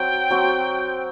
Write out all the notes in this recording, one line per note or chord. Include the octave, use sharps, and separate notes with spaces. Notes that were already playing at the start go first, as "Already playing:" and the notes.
Already playing: F#3 C4 F#4 G5
F#3 C4 F#4